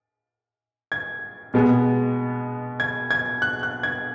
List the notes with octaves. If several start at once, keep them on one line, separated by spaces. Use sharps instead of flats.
G#6
B2 G#3 B3
G#6
G#6
F#6
F#6
G#6